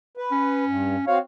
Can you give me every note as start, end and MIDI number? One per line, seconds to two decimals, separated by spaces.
0.17 0.65 71
0.31 1.03 61
0.68 0.96 43
1.07 1.18 60
1.07 1.18 66
1.07 1.20 73
1.07 1.18 77